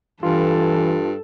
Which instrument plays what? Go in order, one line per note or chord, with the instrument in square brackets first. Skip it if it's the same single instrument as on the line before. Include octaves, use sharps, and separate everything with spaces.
[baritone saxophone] G2 [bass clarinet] E3 [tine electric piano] F4 [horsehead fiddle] A4